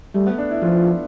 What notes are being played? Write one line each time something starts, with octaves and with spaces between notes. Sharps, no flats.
G3 A3
B3
D4
E4
F3 F4
F4